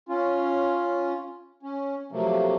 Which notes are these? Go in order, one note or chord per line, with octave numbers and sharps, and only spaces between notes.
C#4 F4
C#4
C3 F3 F#3 A3 A#3